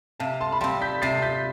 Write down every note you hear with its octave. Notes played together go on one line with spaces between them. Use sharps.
C3 F5 A5
A5 C6
B5
G3 C4 A5 C6
G6 B6
C3 A6 C7
G6 B6